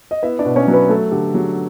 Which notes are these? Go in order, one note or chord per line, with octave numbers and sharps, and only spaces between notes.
D#5
B3 E4 E5
D4 D5
B2
C#4 C#5
F#3
B3 B4
A3 A4
D3 G4
F#3 G#4